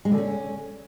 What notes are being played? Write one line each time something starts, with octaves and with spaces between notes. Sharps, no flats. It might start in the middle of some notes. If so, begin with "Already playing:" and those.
G#3
D3
C#4